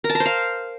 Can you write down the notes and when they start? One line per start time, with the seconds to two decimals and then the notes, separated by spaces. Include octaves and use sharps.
0.04 A#4
0.10 A5
0.15 A#4
0.20 C5
0.26 F5